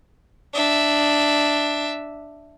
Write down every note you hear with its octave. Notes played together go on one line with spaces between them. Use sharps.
D4 E5